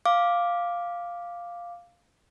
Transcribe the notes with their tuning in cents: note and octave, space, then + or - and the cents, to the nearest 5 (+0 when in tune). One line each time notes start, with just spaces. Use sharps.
F5 +0 D6 +0